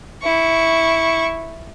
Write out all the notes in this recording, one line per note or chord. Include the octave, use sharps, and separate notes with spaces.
E4 C#6